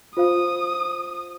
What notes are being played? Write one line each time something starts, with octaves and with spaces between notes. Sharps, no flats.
F4 C5 F5 D#6